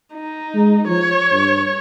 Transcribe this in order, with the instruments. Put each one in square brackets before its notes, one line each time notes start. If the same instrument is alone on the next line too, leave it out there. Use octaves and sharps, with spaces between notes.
[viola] D#4
[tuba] G#3
[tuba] F3 [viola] C#5
[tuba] G2